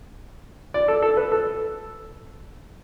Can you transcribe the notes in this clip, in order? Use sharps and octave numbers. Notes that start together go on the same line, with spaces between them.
D5
A4
A4
B4
A4